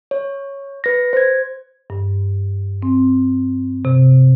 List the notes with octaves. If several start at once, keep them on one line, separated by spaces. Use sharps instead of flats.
C#5
B4 A#6
C5 G#6
G2
C4
C3